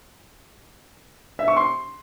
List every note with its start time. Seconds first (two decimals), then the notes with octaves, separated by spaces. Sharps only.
1.39 E5
1.48 C#6
1.57 C6